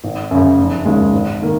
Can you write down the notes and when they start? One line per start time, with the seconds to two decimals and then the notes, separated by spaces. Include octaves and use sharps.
0.04 G#1
0.31 F#2 C#3
0.58 F1
0.85 D#2 C#3 G#3
1.13 G#1
1.42 D#3 A#3